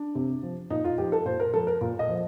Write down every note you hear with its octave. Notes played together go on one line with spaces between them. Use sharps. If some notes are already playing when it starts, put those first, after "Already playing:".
Already playing: D4
C3
F3
A#2 D#4
F4
F3 G4
A4
A#2 C5
A#4
F3 A4
A#4
A#2
D#5
F3